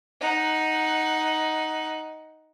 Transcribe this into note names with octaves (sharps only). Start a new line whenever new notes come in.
D#4 F#5